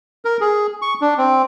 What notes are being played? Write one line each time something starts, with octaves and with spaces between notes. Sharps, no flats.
A#4
G#4
C#6
D4
C4